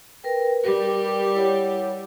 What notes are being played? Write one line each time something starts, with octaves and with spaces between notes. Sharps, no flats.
A#4 B4 G5
G3 G4 A#4
E4 C#5 F#5